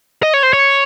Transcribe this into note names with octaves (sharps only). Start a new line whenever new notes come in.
D#5
C#5
C5
C#5